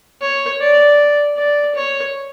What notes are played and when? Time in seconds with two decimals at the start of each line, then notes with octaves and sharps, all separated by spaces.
0.21 C#5
0.61 D5
1.37 D5
1.75 C#5